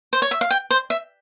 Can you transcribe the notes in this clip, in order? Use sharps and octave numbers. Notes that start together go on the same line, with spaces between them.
C5
C#5
E5
F5
G5
C5
E5